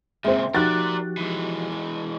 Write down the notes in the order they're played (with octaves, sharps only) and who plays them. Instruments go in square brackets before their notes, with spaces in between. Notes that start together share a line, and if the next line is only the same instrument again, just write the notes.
[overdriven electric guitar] A#2 C#3 [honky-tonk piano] G#3 C4 [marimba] E5
[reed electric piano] F3 F#4 G4 [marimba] D#4 [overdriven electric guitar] A#4 D5 [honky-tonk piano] F#6 A6
[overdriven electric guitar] E3 G#3